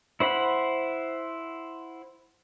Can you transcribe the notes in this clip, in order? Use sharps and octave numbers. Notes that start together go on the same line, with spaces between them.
E4 C5 F#5 B5